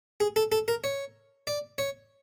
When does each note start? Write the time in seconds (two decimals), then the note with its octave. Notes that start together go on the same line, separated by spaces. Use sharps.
0.20 G#4
0.36 A4
0.52 A4
0.68 A#4
0.84 C#5
1.47 D5
1.78 C#5